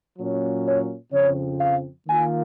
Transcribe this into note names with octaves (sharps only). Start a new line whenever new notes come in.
A#2 F#3 A#3 C#4
C#5
F2 C#3 F3 C4 C#5
F5
D#3 A#3 F4 G#5